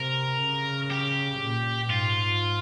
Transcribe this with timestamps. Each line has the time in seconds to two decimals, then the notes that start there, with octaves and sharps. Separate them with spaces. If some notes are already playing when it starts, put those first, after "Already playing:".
Already playing: C3 A#4
0.41 C#3
0.90 G4
1.40 A#2
1.90 G#2 F4